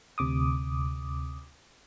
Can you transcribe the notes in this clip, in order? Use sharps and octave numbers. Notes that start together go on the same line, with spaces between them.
D2 C3 D6 D#6